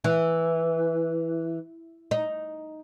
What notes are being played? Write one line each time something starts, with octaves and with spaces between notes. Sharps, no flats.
E3
D#4